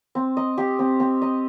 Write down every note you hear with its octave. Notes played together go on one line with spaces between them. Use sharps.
C4
D#5
G4
C4
C4
D#5